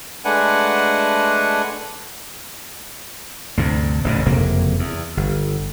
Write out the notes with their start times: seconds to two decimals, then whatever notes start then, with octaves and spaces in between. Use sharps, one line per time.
0.25 G#3 A3 D4 B4 F#5 G#5
3.57 D2 G2 C3
4.04 A1 F#2 C#3
4.26 F#1 F2 C3 A#3
4.79 E2
5.17 G1